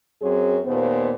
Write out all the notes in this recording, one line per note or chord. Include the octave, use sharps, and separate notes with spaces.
F#2 C4 G#4 C#5
D#2 A#2 B3 C5